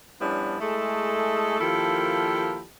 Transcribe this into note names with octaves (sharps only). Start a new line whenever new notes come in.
F3 G3 B3 C#4 D4 E4
G#3 A3 E4 G#4 A4
D#3 F3 A#3 E4 G4 A4